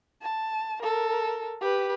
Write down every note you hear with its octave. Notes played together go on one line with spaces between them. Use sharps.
A5
A4 A#4
G4 B4